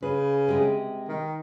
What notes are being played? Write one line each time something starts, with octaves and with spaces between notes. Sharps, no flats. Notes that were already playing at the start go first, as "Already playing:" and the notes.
C#3 B4
C3 G#3
D#3